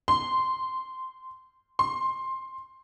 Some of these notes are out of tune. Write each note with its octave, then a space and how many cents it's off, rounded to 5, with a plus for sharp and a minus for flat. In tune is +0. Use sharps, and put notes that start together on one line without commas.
C6 -10
C6 +15